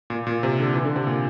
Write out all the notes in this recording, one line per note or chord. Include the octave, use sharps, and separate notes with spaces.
A#2
A#2
C3
D3
E3
D3
C3
A#2